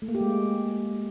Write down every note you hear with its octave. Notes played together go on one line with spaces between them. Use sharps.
A3
A#3
G4
G#3